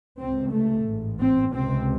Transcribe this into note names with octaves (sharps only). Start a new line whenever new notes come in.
C#2 C3 C4
A3
A1 G#2
C4
C#2 C3 C4